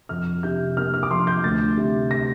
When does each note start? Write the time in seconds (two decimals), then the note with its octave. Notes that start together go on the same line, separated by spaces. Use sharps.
0.09 F2 F6
0.43 C3 G6
0.77 A#3 F6
0.94 F6
1.03 D6
1.10 F3 C6
1.27 G6
1.44 D2 A6
1.77 C3
2.11 A#6